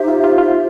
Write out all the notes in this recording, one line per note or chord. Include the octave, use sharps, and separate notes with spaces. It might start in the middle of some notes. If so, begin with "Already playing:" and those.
Already playing: D#4 G4 C5 E5
F4
F4
F4